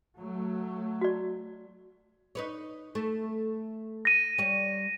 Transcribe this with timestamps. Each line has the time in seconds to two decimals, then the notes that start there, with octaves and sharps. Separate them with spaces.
0.17 F#3 A3
1.01 F#4 D5
2.35 D#4 B4 C#5
2.95 A3
4.05 A#6 D#7
4.38 G3 C#5